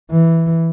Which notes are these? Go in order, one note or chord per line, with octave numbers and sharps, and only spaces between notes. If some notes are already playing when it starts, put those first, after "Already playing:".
E3